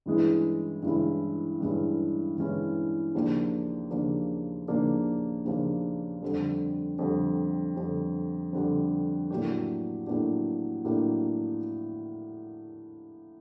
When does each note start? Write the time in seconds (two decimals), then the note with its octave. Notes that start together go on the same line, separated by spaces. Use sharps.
0.06 G2 E3 G#3 C#4 E4
0.83 G2 E3 G#3 C#4 E4
1.60 G2 E3 G#3 C#4 E4
2.37 G2 E3 G#3 C#4 E4
3.15 D#2 C#3 F3 A#3 D4
3.91 D#2 C#3 F3 A#3 D4
4.68 D#2 C#3 F3 A#3 D4
5.45 D#2 C#3 F3 A#3 D4
6.22 F2 D3 G3
6.99 F2 D3 G3
7.76 F2 D3 G3
8.53 F2 D3 G3
9.30 A2 F#3 A#3 D4 G4
10.07 A2 F#3 A#3 D4 G4
10.84 A2 F#3 A#3 D4 G4